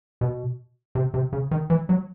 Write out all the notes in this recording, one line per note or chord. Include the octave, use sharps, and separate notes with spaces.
B2
C3
C3
C#3
D#3
E3
F#3